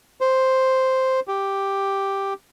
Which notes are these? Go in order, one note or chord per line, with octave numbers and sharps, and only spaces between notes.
C5
G4